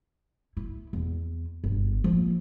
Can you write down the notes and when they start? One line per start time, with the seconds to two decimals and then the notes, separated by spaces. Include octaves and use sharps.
0.57 E4
0.93 E2
1.64 G1
2.04 F3 A#3